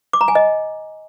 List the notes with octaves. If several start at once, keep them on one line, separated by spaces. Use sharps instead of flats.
D6
A#5
G#5
D#5